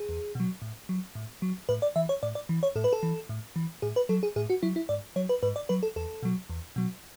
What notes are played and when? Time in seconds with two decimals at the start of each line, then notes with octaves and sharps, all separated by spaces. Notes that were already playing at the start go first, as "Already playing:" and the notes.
Already playing: G#4
0.09 E2
0.35 B2 F#3
0.62 A2
0.89 F#3
1.15 A2
1.42 F#3
1.69 A2 B4
1.82 D5
1.96 E3 E5
2.09 C#5
2.23 A2 D5
2.35 D5
2.49 E3
2.63 C#5
2.76 A2 A4
2.84 B4
2.93 A4
3.03 E3
3.29 A2
3.56 E3
3.82 A2 G#4
3.96 B4
4.09 F#3 A4
4.23 G#4
4.36 A2 G#4
4.50 F#4
4.63 F#3 E4
4.76 E4
4.89 G#2 D5
5.16 F#3 C#5
5.29 B4
5.43 G#2 B4
5.56 D5
5.69 F#3 B4
5.83 A4
5.96 E2 A4
6.23 B2 F#3
6.50 E2
6.76 B2 F#3